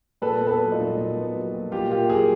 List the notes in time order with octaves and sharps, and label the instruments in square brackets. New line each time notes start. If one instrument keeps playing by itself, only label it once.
[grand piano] A#2 A4 B4
B3
A4 B4
F#3
D#4 F4
A#2
A#2
B3
F#3
A#2
A#2 F4 G4
A#3 F4 G4
F#3 G#4 A#4